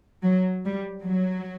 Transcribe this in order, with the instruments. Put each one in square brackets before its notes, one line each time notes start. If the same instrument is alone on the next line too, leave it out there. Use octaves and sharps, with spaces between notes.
[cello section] F#3
G3
F#3